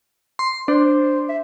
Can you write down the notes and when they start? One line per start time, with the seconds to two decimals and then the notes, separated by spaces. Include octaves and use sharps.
0.39 C6
0.68 D4 C5
1.29 E5